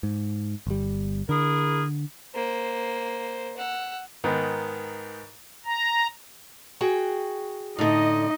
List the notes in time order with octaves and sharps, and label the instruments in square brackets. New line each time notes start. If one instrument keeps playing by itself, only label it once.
[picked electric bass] G#2
G1 G3
[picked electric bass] D3 [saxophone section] E4 G#4 A#4
[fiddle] A#3 C5
F#5 E6
[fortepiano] G#2 D#3 B3
[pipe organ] A#5
[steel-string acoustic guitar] F#4 G#4 G5
[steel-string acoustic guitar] A2 D3 [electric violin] D#4 D#5